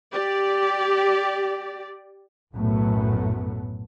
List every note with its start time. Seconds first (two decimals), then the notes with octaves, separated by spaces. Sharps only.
0.12 G4 D5
2.54 B1 F#2 A2 F#3 A3 B3